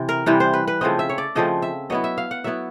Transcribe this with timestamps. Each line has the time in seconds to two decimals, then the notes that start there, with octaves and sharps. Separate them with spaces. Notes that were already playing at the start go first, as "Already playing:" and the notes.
Already playing: C3 E3 C4
0.09 A#4
0.26 C3 E3 G3 C4 B4
0.40 C5
0.54 B4
0.67 B4
0.81 C#3 F3 A3 C4 D#5
0.99 E5
1.09 C#5
1.18 D5
1.35 C#3 F3 A3 C4 D#5
1.62 E5
1.90 F#3 B3 E4 D#5
2.04 E5
2.18 F5
2.31 F#5
2.44 F#3 B3 E4 E5